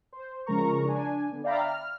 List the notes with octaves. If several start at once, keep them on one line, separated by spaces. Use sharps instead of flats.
C5
C#3 F3 G#3 A#4 A#5 C#6
D4 G#5
D3 B3
D5 E5 F5 G5 A#5 B5
F6